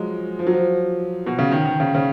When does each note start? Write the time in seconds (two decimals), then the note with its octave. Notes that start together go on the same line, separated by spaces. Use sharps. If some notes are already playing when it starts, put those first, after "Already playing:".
Already playing: F3 F#3 G#3
0.39 F3
0.47 F#3
0.53 F3
1.26 B2
1.39 C#3
1.52 D#3
1.66 D#3
1.80 C#3
1.95 C#3